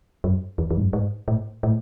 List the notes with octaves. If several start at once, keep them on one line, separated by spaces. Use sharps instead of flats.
F#2
E2
E2
G#2
F#2
G#2
A2
A2